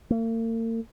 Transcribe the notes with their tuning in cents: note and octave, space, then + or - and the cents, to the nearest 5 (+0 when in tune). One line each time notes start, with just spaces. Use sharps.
A#3 -45